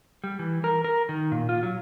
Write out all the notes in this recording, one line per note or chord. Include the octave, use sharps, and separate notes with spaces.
G3
E3
A#4
A#4
D#3
A#2
F4
F#3